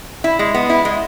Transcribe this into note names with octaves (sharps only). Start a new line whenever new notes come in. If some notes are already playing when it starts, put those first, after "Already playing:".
E4
G#3
B3
E4
G#3